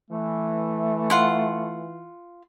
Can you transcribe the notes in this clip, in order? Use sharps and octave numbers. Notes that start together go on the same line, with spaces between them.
E3 A3
F4 F#5 C6